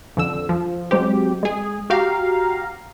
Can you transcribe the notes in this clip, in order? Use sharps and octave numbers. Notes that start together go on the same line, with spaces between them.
F2 D3 E6
F3
F#3 G#3 C4 G4
G#3 G#4
F#4 G4 F5 A#5